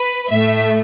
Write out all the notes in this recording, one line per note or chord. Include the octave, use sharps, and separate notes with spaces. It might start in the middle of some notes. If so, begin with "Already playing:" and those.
Already playing: B4
A2 A3 E5